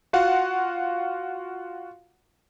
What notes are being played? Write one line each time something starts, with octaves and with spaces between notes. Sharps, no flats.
F4 F#4 F5 F#5